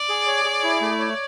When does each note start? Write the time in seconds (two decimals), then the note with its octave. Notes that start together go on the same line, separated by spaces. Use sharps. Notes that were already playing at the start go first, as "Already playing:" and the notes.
Already playing: D5
0.09 G#4
0.26 C#5
0.45 G#4
0.63 E4
0.81 A3
0.99 C#5